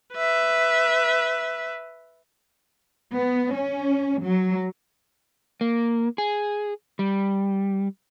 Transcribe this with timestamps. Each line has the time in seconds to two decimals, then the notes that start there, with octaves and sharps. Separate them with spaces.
0.14 B4 E5
3.14 B3
3.51 C#4
4.20 F#3
5.61 A#3
6.18 G#4
6.99 G3